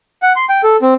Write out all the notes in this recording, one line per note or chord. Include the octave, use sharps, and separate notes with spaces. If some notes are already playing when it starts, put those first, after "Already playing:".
F#5
C6
G5
A4
C4